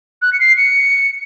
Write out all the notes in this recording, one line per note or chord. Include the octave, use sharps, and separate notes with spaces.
F#6
C#7
C7
C#7